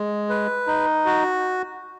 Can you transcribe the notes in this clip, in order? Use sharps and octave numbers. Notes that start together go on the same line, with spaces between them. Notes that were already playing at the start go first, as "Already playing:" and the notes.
Already playing: G#3
B4
D#4
F#4